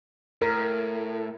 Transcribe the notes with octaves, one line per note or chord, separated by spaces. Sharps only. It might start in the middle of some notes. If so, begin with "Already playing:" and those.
A2 A#4